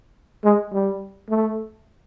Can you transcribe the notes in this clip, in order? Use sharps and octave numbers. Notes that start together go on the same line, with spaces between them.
G#3
G3
A3